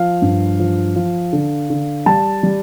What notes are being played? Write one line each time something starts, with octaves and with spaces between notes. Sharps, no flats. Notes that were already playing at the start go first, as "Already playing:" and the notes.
Already playing: F3 F5
G2
F3
F3
D3
D3
G3 A5
G3